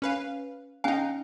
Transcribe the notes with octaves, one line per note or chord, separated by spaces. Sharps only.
C#4 B4 F5
C#4 D#4 F5 G#5